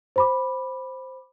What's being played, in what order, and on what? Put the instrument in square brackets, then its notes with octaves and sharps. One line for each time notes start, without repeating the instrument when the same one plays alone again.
[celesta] C5 B5 D6